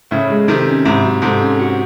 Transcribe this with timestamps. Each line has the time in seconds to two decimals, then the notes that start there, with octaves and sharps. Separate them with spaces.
0.11 A2 C#3 E4
0.30 G#3
0.48 C3 D#3 A4
0.67 C#4
0.85 G#2 C3 E4
1.04 F#3
1.22 G#2 C3 A4
1.41 C#4
1.59 F#4